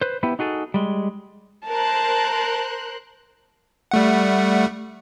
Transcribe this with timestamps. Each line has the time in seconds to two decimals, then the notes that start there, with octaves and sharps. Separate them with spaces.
0.01 B4 C5
0.23 B3 E4 G4 B4
0.39 D#4 F#4 G#4 A4
0.74 G3 G#3
1.67 A#4 C5 A5 F#6
3.91 G3 A3 F#5